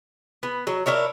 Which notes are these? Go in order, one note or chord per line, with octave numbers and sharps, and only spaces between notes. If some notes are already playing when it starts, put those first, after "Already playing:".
B3
F#3
D4 E4 A#4 C#5